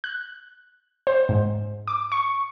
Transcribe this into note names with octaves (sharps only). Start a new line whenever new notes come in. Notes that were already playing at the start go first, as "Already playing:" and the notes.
F#6
C5
G#2
D6
C#6